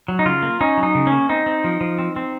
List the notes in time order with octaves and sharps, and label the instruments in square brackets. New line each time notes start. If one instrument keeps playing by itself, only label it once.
[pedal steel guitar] F#3
D#4
C#3 F4
A#3
C#4 D#4
F#3
D#4
C#3
C#4
A#3
C4 D#4
C4
F3
F3
C4
C4